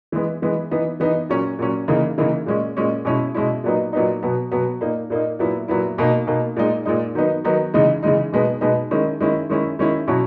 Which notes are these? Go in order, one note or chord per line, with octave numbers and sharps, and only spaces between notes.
E3 G#3 B3
E3 G#3 B3
E3 B3 D#4
E3 B3 D#4
A#2 F#3 C#4
A#2 F#3 C#4
C#3 E3 A#3 D#4
C#3 E3 A#3 D#4
A#2 G#3 C#4
A#2 G#3 C#4
B2 G#3 C#4 E4
B2 G#3 C#4 E4
A#2 F#3 B3 D#4
A#2 F#3 B3 D#4
B2 F#3 B3
B2 F#3 B3
A#2 A#3 D#4
A#2 A#3 D#4
A#2 F#3 B3 E4
A#2 F#3 B3 E4
B2 A#3 D#4
B2 A#3 D#4
A#2 G#3 D#4
A#2 G#3 D#4
D#3 F#3 B3 D#4
D#3 F#3 B3 D#4
C#3 E3 G#3 D#4
C#3 E3 G#3 D#4
B2 G#3 B3 D#4
B2 G#3 B3 D#4
D#3 G#3 C#4 E4
D#3 G#3 C#4 E4
D#3 G#3 C#4 E4
D#3 G#3 C#4 E4
B2 F#3 C#4 E4